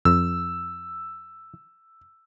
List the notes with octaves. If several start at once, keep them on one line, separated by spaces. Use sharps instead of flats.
F2 E6